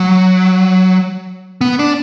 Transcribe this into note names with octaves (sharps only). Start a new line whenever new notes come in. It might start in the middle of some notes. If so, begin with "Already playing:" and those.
Already playing: F#3
B3
D4